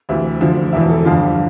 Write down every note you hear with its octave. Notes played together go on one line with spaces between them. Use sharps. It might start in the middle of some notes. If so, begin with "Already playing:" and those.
D2 C3 E3 E5
D2 D3 F3
E1 E2 E3 E5
A4
G1 F2 D3 F4
G4